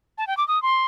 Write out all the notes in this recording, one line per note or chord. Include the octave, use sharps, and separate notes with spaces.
A5
G5
D6
D#6
C6